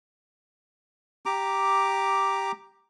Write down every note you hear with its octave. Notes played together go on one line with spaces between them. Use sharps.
G4 A#5 D6